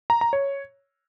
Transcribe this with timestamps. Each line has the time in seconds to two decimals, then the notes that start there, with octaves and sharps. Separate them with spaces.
0.10 A#5
0.21 A#5
0.33 C#5